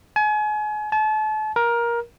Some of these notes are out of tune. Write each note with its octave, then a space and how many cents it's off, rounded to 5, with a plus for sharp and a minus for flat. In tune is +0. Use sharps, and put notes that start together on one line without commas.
G#5 +35
A5 -35
A#4 +15